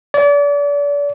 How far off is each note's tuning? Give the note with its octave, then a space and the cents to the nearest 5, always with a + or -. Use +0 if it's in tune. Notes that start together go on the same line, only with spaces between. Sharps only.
D5 -35